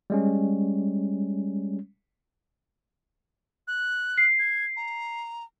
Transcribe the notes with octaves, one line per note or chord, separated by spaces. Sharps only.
G3 G#3 C#4
F#6
C7
G#6
A#5